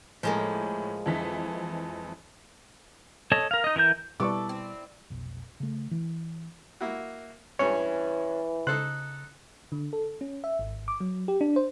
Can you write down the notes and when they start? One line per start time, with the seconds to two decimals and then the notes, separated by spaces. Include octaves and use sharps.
0.23 A2 F3 G#3 A#3
1.06 F2 E3 B6
3.32 A4 C#5 D#5 A5
3.51 A#4 F5
3.64 D#4 D#5
3.76 E3 E4 A#4 G6
4.20 B2 G3 B3 E4 A4 D5 C#6 D6
4.49 C4
5.10 F1 B1
5.60 C#3 A3
5.91 E3
6.81 A#3 E4 F#4
7.59 G2 E3 C#4 C#5
8.67 C#3 D#4 A4 C5 F#6
9.72 D3
9.93 A4
10.21 C#4
10.44 E5
10.59 G#1
10.88 D6
11.00 F#3
11.28 G4
11.41 D4
11.56 C5